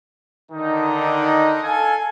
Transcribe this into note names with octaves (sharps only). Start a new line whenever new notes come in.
D3 D#3 D#4
A4 F5 G#5